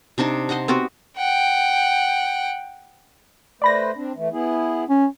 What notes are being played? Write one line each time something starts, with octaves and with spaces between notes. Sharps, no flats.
C3 D4 D#4 A5
C5 D#5 F#5 A#5
B3 C4 F#4 G4
F#5 G5
A3 B4 C5 D5 B5 A#6
C4 D4
E3 A3
B3 E4 G#4
C#4